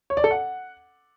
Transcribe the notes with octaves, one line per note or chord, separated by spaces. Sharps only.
C#5
D5
A4
F#5